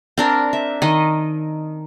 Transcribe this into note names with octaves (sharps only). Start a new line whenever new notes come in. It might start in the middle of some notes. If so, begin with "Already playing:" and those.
C4 D4 A#4
E5
D#3 D#5